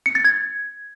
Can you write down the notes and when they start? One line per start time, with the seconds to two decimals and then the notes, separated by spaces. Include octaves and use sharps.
0.06 C#7
0.15 A6
0.25 G#6